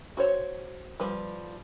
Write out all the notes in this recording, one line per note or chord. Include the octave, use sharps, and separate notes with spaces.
F#4 C5 C#5
F3 G3 B4